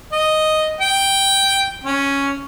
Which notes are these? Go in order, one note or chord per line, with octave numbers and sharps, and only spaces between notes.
D#5
G5
C#4